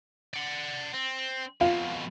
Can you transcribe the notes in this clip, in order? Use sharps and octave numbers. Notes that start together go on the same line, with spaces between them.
D5 F#5
C4
F2 B2 F4